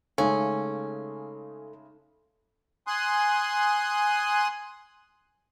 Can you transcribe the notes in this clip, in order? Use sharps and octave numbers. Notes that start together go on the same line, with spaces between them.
C#3 G#3 A3 C#4 D#4 A4 F5
G#5 C6 D#6 F#6